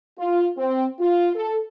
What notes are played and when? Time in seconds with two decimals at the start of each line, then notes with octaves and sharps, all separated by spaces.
0.18 F4
0.57 C4
1.00 F4
1.35 A4